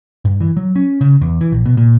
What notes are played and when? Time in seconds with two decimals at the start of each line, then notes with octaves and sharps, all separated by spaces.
0.25 G2
0.41 E3
0.57 F#3
0.76 C#4
1.01 C#3
1.22 E2
1.41 E3
1.52 A#1
1.66 B2
1.77 A#2